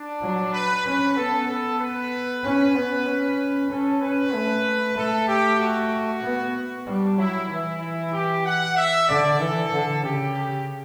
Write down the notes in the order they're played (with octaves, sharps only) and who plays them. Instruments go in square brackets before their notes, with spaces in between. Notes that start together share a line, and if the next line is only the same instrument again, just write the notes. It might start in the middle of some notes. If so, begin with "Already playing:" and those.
Already playing: [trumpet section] D4
[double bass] F#3
[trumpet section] B4
[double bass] C#4 [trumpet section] B4
[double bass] B3 [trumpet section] A4
[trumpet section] A4
B4
[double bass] C#4
B3
C#4
[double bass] C#4 [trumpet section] A4
[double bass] C#4 [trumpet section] B4
[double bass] A3
[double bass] A3 [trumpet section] A4
[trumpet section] G4
F#4
[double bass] B3
[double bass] G3 [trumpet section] D4
[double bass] F#3 [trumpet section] E4
[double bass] E3 [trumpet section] E4
[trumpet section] E4
G4
F#5
E5
[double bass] D3 [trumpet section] D5
[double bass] E3 [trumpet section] A4
[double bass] D3
[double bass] C#3 [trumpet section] G4